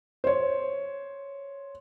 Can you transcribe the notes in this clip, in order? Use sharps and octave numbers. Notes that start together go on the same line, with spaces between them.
C5 C#5